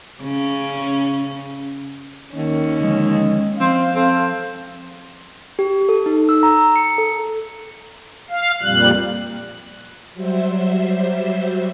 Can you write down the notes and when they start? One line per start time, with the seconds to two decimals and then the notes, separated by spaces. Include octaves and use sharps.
0.22 C#3 C#4
2.35 D#2 D#3 C#4
2.81 D3 F3 G#3
3.60 F3 C4 F5 C6
3.95 C4 A4
5.59 G4
5.89 A4
6.06 D#4
6.29 E6
6.43 A#5
6.76 C#7
6.98 A4
8.30 F5
8.63 F2 A#2 G3 F#6
10.14 F#3 G3 C5 E5